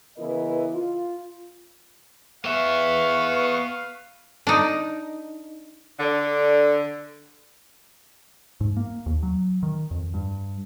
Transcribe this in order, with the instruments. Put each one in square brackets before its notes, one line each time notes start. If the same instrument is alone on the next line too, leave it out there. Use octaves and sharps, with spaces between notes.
[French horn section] C#3 E3 B3 E4 A#4 D#5
F4
[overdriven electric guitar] B3 E5 [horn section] B4 F5 [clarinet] C#6
[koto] D4 D#4
[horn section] D3
[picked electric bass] G#2
A#3
D#2
F#3
D#3
F2
G2